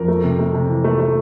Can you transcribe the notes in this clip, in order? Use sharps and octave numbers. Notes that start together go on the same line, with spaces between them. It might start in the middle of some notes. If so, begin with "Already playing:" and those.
Already playing: F2 A#4
A3
C3
A3
C3
E3
A3
A3